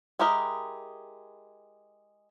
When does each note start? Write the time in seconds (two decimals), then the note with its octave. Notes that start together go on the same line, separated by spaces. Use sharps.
0.19 G#3 E4 G4 A#4 D#5